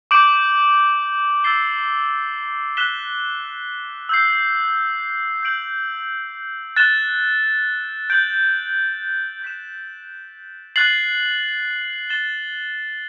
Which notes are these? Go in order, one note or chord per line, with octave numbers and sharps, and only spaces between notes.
D6 G6 D7 F#7
E6 A6 C7 G7
F#6 B6 E7 G7
E6 G6 C7
G6 D7 F#7
F#6 A6 E7 G7
G6 D7 F#7
G6 B6 E7
F#6 A6 C7 F#7
A6 E7 G7